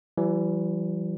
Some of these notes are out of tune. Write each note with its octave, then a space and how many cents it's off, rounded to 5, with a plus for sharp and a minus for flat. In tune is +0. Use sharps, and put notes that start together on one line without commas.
E3 +25 G3 -35